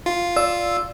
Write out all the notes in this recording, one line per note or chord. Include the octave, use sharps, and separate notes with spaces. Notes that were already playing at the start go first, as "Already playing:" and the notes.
F4
D5 E6